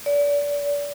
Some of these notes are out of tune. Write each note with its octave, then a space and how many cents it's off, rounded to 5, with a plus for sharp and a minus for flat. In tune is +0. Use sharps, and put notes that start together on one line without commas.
D5 -30